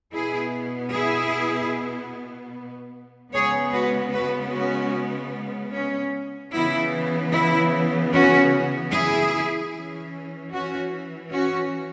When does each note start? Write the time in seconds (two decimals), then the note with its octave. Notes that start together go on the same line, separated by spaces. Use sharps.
0.14 B2 B3 E4 G#4
0.93 E4 G#4
3.33 C#3 G#3 B3 G#4 C#5
3.73 F#4 B4
4.13 F#4 B4
4.53 C#4 F#4
5.73 C#4
6.52 C#3 E3 B3 E4
7.33 E4
8.12 C#4 F#4
8.92 E4 G#4
9.72 E3 C#4
10.52 C#4 F#4
11.31 C#4 F#4